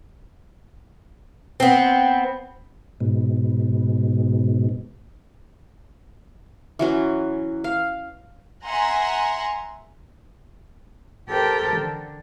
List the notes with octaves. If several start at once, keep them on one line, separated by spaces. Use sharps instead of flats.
B3 C4
G#2 B2
E3 F#3 C#4
F5
E5 F#5 G#5 A#5 C6
G4 A4 A#4 C5 G5
D3